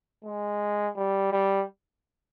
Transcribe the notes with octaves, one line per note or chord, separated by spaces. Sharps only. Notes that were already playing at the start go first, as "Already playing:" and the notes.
G#3
G3
G3